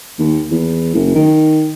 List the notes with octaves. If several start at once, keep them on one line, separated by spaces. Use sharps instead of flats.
D#2
E2
F#1
D#3